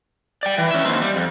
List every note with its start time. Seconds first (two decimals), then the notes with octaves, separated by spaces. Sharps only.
0.43 D5 G5
0.58 E3
0.71 C#4 E5
0.85 D#2 C4
1.02 G3
1.16 F2